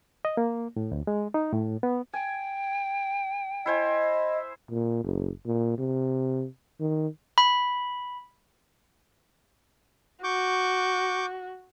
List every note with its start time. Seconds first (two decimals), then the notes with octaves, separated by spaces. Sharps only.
0.25 D#5
0.37 A#3
0.76 A2
0.92 D2
1.07 G#3
1.34 D#4
1.53 A2
1.83 B3
2.14 G5 G#5
3.66 E4 C5 D#5 G#5
4.71 A#2
5.04 F#1
5.46 A#2
5.79 C3
6.80 D#3
7.38 B5
10.24 F#4 C#6 D6 G6